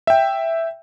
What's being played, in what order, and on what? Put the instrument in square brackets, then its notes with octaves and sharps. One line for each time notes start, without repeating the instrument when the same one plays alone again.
[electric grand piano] E5 G5